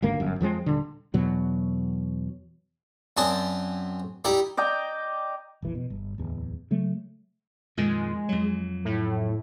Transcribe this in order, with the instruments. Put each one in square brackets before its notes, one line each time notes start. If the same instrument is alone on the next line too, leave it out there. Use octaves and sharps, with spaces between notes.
[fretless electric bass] G#1 D2 A#3
G1 F#2
F2 F3 G#3 C4
D#1 D3
E2 B2 F#3
[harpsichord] F#2 C4 D5 G#5 A5 D#6
D#4 E4 G4 D5
[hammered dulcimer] D5 D#5 G5 A#5
[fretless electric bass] F1 A#1 E3
B2
G1
D1 E2
C#3 F#3 A3
[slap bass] F2 A#2 D#3 [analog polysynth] G#3
[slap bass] F2 F#3
[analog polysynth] A2